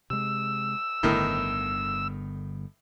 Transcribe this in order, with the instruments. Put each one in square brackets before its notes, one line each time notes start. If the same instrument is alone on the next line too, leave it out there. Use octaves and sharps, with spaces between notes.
[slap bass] C3 G#3 [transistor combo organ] E6
[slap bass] G1 D3 B3 [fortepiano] A2 D#3